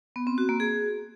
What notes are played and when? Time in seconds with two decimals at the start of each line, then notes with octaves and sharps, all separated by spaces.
0.16 B3
0.27 C4
0.38 F#4
0.49 A#3
0.60 G#4